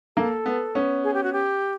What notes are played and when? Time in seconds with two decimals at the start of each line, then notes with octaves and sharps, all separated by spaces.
0.17 A#3 A4
0.46 B3
0.75 B3 C#4
1.04 G#4
1.14 G4
1.23 F#4
1.33 G4